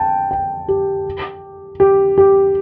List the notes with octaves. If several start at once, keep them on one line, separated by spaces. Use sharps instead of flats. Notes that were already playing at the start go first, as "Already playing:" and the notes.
Already playing: G5 A5
G5
G4
G4
G4